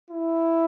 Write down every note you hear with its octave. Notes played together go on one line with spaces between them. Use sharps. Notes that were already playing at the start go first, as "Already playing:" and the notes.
E4